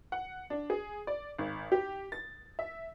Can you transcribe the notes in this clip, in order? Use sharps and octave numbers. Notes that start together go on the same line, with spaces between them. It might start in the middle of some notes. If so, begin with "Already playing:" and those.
F#5
D4
G#4
D5
G#1
G4
A6
E5